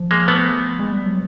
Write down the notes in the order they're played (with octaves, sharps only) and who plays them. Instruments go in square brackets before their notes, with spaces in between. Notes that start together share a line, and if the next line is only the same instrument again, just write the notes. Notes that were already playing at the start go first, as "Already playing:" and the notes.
Already playing: [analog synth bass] F3
[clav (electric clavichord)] G#3 A#3
A3 B3
[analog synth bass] G#3
G3
F#3